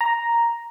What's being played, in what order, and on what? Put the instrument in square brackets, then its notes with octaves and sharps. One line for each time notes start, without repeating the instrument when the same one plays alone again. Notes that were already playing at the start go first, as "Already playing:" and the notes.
[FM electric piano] A#5